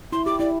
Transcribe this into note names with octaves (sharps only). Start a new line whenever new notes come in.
E4 C6
G4 D6
E4 D5